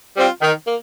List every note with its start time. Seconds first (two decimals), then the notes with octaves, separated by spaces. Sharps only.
0.16 G3 C4 F4
0.41 D#3
0.66 A#3